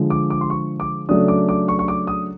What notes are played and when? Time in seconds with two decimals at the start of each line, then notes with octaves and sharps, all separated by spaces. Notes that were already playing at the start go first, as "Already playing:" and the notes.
Already playing: D3 F3 G#3
0.10 D6
0.30 D6
0.41 C6
0.50 C#6
0.80 D6
1.09 C#3 F#3 A3 D4 D#6
1.28 D6
1.49 D6
1.68 C#6
1.79 C#6
1.88 D6
2.07 D#6